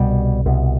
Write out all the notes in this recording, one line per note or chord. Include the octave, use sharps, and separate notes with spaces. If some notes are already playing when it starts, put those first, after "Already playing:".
Already playing: C2 B2 G3
C2 B2